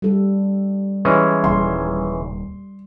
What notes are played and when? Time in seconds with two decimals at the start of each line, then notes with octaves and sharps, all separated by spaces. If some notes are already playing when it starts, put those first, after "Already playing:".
0.02 G3 A4
1.05 E3 G#3 C#4
1.44 D#1 C6